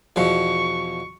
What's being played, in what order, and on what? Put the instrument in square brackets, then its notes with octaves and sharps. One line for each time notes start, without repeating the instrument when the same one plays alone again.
[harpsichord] E2 B2 F3 [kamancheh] C#6